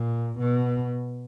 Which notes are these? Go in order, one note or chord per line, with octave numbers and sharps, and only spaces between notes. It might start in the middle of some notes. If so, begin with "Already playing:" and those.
Already playing: A#2
B2